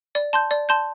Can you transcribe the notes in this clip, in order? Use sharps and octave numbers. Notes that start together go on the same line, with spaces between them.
D5
A5 C6 G6
D5
A5 C6 G6